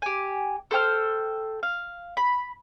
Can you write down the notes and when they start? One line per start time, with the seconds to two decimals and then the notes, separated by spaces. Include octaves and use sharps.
0.02 G4 G#5
0.71 A4 C5 G5 F6
1.63 F5
2.17 B5